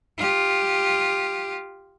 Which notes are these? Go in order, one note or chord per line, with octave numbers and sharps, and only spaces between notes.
F4 G4